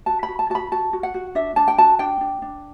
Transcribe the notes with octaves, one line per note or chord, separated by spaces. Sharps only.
F#4 A5
B5
F#4
A5
F#4 A5
B5
F#4 A5
F#4
F#5
F#4
D4 E5
D4 A5
G5
F#4 A5
D4 G5
D4
D4